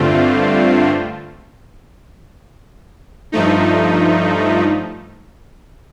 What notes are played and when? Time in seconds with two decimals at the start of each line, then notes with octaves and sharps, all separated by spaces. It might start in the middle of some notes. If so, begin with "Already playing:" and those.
Already playing: G2 D3 A3 C4 F4
3.32 G2 F3 A3 D#4